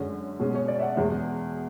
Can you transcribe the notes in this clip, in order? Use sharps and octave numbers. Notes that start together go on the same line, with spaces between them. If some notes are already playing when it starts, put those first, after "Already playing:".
Already playing: F#2 D3 G#3 C#4
B2 G#3 C#4
C#5
D5
E5
F#5
E2 B2 G#3